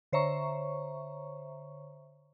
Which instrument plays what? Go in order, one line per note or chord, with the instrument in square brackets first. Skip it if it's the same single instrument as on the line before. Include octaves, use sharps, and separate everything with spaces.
[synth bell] D3 C5 C#5 E5 A#5 C#6